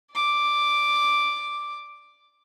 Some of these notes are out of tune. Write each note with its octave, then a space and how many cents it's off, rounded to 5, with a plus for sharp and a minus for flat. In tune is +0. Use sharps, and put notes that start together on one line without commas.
D5 +0 D6 +0